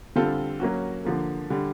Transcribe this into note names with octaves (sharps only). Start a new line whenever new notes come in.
D3 G3 C4 F4 A4
F#3 A#3 C#4 F#4
D3 F3 A#3
D3 G3